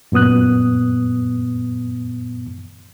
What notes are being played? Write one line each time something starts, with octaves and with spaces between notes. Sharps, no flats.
F#2 A#2 B3 D#6 F#6